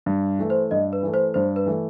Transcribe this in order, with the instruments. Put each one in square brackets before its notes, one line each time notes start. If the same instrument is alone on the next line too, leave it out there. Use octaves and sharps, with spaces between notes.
[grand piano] G2
E3 A3
[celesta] C5
[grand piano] G2 [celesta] D#5
[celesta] B4
[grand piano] E3 A3
[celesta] C5
[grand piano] G2 [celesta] C5
[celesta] B4
[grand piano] E3 A3